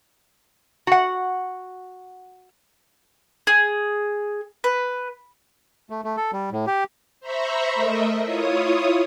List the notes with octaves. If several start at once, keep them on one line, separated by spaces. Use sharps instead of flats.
F#4 F#5
G#4
B4
A3
A3
A4
G3
A2
G4
C5 E5 A#5 B5 C#6
A3 A#4 D#5 E5
E4 F4 C#5 D#6